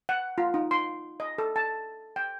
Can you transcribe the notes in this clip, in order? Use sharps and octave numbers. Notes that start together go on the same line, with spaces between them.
F#5
F4
D#4
C6
D#5
A4
A5
G5